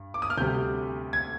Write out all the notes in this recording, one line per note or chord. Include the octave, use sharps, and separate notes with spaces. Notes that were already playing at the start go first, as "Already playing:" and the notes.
Already playing: G2
D6
D#6
F6
D2 C3 G3 G6
G#6